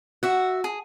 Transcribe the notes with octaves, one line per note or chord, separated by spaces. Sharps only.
F#4 E5 F#5
G#4